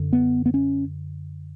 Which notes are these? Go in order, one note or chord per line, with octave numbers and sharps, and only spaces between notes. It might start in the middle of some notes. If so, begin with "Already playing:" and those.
Already playing: F#2 D3
B3
B3
C#4